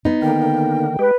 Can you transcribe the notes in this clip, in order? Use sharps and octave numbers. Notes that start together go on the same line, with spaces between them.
B3 D#4
D3 D#3 A#3 G5
G#3 G4 B4